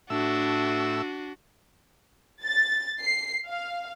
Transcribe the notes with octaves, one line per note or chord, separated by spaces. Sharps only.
A2 D4 F#4 E5 E6
A6
C7
F5